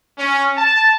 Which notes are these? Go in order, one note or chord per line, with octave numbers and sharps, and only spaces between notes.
C#4
A5